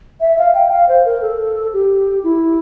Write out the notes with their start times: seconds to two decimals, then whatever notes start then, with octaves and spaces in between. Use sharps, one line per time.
0.21 E5
0.38 F5
0.54 G5
0.72 F5
0.89 C5
1.05 A#4
1.22 A4
1.73 G4
2.24 E4